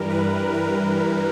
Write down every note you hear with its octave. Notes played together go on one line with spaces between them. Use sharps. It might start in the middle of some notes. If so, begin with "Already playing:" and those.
Already playing: G2 E3 G3 A#4
B4
A#4